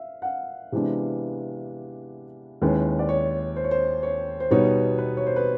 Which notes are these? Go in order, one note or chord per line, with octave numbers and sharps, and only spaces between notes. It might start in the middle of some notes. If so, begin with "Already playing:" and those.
Already playing: E5 F5
F#5
F5
C3 E3 G#3 B3 D4
D#2 D#3 G#3 C#4 E4 B4
D5
C#5
C5
C#5
C5
C#5
C5
B2 G3 B3 D#4 C#5
B4
C#5
C5
B4